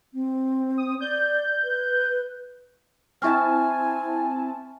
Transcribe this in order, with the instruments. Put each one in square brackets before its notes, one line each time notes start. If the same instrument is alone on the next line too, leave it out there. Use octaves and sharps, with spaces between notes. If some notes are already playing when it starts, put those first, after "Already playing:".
[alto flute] C4
[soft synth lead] D#6
[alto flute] D5 [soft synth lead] G6
[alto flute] B4
[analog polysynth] C4 E4 A5 [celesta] E5 C#6 F6 [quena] G#5